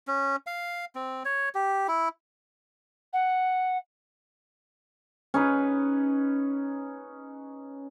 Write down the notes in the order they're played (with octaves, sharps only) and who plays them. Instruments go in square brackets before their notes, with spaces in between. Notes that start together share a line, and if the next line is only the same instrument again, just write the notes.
[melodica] C#4
F5
C4
C#5
G4
E4
[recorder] F#5
[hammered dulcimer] C#4 D#4 B4